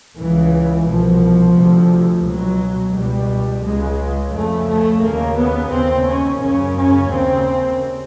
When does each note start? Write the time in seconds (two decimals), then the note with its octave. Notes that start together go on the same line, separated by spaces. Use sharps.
0.18 C#2 C#3 E3
0.88 C2 B2 F3
1.57 D2 C3
2.26 C#2 B2 F#3
2.95 C#2 B2 G3
3.64 C#2 C#3 G#3
4.34 F2 C#3 A3
4.69 A3
5.03 D#2 C#3 A#3
5.38 B3
5.72 D#2 C#3 C4
6.07 C#4
6.42 F#2 C#3 C#4
6.77 C#4
7.11 D#2 C#3 C4